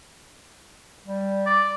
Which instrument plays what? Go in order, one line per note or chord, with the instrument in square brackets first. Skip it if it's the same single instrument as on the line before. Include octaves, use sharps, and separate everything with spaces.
[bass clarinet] G3
[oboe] D5